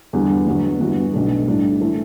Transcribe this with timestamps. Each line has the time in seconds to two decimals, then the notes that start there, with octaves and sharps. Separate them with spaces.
0.13 E2 D3 G3 B3
0.47 G1 G2 F#3 B3
0.80 G1 G2 E3 B3 F#4
1.14 B1 B2 A3 D4 A4
1.48 A2 G3 D4
1.81 E3 A3 E4